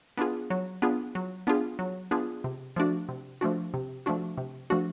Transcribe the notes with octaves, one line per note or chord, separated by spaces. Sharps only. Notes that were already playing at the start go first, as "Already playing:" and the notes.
B3 D4 F4 G#4
F#3
B3 D4 F4 G#4
F#3
B3 D4 F4 G#4
F#3
B3 D4 F4 G#4
C3
F3 A3 D4 F#4
C3
F3 A3 D4 F#4
C3
F3 A3 D4 F#4
C3
F3 A3 D4 F#4